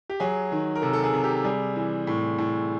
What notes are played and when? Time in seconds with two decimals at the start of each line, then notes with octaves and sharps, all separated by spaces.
0.10 G4
0.20 F#3 G#4
0.52 D#3
0.75 A#4
0.82 C3 A4
0.93 A4
1.04 G#4
1.14 C3
1.24 G4
1.44 G3 G#4
1.76 E3
2.07 A2
2.38 A2